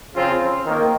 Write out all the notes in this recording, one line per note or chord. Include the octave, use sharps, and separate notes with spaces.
C#3 F3 C4 F4
D#3 A#3